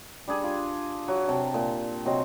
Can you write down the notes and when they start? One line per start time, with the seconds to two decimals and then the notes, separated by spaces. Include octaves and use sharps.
0.28 G3 D4 G#4
0.44 F4
1.08 F#3
1.27 C3 G5 A5
1.54 A#2
2.05 C3 F#3 C4 D#5